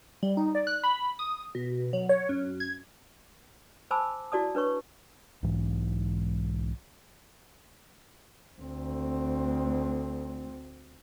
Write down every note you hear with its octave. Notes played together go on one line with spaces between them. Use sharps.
G3
D#4
D5
F#6
B5
D#6
B2
F#3
C#5
F#2
G#6
C5 G#5 A5 B5 D6 E6
E4 F#4 D5 A5 D#6
D4 B4 C#5 C#6
B1 G#2 E3
D2 C4